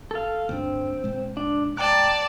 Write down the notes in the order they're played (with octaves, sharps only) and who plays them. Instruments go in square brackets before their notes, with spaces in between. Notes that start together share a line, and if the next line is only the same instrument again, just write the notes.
[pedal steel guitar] A4 F5
[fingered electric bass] D2 G2 D4 [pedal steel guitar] C4
[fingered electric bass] A#2 G#3
[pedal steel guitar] D4
[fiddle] D5 A5 [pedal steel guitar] G5 A#5 F#6